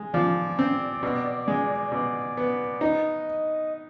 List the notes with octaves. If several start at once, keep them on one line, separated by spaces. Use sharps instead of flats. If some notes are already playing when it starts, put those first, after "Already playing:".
Already playing: G#3
F3 D5
C4
B2
G#3
B2 D5
B3
D#4 D#5